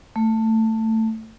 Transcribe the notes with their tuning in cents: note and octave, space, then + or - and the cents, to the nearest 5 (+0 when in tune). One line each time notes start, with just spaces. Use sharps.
A3 +15